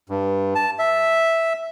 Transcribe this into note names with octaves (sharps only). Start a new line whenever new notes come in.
G2
A5
E5